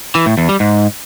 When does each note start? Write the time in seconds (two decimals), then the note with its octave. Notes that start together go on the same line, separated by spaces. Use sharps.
0.15 E3
0.26 A2
0.38 E2
0.49 G3
0.60 G#2